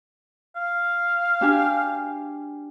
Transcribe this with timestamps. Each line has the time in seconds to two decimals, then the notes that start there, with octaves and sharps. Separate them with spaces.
0.56 F5
1.41 D4 G4 G#5